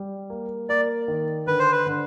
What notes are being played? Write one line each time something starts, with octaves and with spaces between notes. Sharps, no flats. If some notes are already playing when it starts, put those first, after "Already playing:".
Already playing: G3
A#3
A#3 D5
D#3
D3 B4
C5
B4
D3